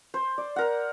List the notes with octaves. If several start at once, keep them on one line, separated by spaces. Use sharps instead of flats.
C5
D5
A#4 F#5